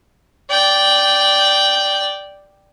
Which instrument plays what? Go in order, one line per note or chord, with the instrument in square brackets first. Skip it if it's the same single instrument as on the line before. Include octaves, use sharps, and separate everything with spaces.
[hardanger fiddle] D5 G5